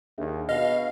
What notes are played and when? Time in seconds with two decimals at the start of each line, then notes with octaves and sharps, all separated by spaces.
0.18 D#2 D4 G#4 E5
0.49 B2 D#5 F5